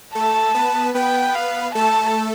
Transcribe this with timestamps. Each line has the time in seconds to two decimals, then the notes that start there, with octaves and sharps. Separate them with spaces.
0.14 A3 A4 A5
0.54 B3 B4
0.95 B3 B4 G5
1.35 F5
1.75 A3 A4 A5